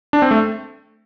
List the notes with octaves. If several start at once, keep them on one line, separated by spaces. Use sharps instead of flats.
D4
C4
A3